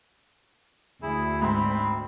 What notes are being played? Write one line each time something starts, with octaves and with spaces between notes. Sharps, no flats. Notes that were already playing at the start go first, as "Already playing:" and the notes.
D2 E4 G#4
G#2 C4 B5